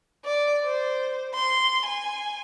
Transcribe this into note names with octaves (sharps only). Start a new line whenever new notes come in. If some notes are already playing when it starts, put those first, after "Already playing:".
D5
C5
C6
G#5